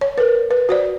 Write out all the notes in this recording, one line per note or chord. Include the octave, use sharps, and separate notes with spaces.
C#5
A#4 B4
B4
F#4 C5 D5